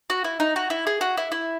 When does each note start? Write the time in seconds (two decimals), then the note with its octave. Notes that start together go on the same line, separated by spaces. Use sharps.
0.10 F#4
0.24 E4
0.40 D#4
0.56 F#4
0.70 E4
0.87 G#4
1.01 F#4
1.17 E4
1.32 E4